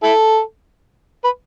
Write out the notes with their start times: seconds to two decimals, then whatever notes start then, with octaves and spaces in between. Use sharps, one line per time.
0.03 E4 A4
1.24 B4